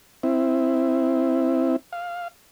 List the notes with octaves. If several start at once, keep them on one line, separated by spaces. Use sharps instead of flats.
C4 E4
F5